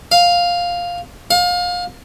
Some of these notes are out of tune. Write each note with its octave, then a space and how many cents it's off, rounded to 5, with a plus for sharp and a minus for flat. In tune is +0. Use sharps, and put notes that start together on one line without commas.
F5 +5
F5 +30